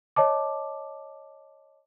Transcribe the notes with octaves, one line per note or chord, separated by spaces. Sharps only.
C#5 D#5 A5 D6